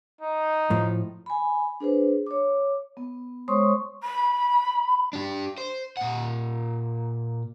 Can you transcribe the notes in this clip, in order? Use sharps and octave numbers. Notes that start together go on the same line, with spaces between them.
D#4
A2 F3
G#5 B5
D4 G#4 B4 C5
C#5 D6
B3
G#3 C5 C#5 C6 C#6 D#6
B5
D4 G4
C5
A#2 F#5